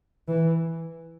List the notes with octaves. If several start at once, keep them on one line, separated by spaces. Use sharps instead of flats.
E3